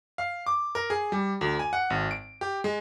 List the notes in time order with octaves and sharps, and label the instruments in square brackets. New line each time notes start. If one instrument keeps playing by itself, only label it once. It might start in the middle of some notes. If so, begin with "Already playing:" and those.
[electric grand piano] F5
D6
A#4
G#4
G3
D2
G#5
F#5
G#1
D7
G4
G#3